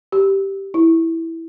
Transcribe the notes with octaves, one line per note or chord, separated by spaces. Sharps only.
G4
E4